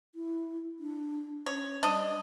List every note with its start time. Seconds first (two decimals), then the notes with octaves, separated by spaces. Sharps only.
0.15 E4
0.79 D4
1.46 C#4 C#5
1.83 G3 D4 D#5